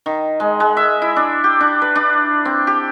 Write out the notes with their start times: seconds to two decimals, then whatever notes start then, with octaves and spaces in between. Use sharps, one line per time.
0.06 D#3
0.40 G#3
0.60 G#3
0.77 E5
1.02 E4
1.16 D4
1.44 G4
1.60 D4
1.82 B4
1.95 D4
2.45 C4
2.67 G4